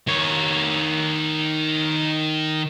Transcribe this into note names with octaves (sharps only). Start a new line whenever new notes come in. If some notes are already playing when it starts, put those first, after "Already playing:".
D#3 C#5